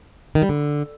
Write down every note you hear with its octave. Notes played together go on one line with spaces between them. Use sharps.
D#3
G3
D3